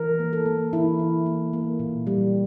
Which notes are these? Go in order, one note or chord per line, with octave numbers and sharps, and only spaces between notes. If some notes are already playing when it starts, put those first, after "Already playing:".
Already playing: E3 A#4
A#3
A4
A#3
E3 E4
E3
A#3
A#3
A#2
G3